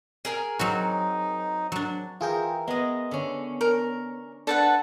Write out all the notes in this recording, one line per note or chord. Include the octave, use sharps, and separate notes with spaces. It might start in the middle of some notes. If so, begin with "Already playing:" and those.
G#4 A#4 G#5
F#3 C4 D#4 F#4
F#3 D4
E3 F4 G#4 A#4 G5
G#3 B3 D#5
D3 C#4
A#4
D4 A4 B4 F#5 A6